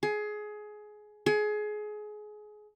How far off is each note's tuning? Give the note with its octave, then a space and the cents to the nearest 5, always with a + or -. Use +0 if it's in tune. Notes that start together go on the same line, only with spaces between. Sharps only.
G#4 +20
G#4 +25